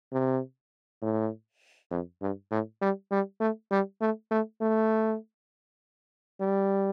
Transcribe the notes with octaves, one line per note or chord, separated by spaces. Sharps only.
C3
A2
F2
G2
A2
G3
G3
A3
G3
A3
A3
A3
G3